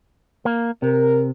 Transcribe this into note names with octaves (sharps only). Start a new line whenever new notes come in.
A#3
C3 A#4